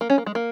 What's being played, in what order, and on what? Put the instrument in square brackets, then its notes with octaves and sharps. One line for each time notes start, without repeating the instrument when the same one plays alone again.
[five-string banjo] A#3
C#4
A#3
G#3
A#3